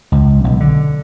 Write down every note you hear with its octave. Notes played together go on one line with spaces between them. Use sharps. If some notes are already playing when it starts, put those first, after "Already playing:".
C#2
B1
D3